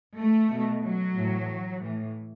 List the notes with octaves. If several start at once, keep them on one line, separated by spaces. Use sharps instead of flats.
A3
B2
F#3
A2 E3
A2 E3